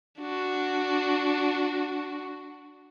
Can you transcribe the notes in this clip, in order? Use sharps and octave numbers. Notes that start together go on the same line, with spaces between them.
D4 F#4